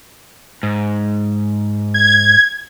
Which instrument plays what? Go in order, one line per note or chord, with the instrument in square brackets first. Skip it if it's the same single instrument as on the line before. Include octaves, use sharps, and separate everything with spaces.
[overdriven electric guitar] G#2
[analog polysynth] G#6